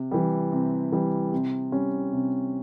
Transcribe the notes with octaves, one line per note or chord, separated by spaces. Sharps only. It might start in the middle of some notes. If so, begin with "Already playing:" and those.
Already playing: C3
E3 G3
C3
E3 G3
C3
G3 C#4
C3